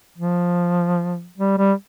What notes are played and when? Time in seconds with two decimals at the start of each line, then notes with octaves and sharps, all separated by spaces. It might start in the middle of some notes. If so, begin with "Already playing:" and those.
0.18 F3
1.38 G3
1.58 G3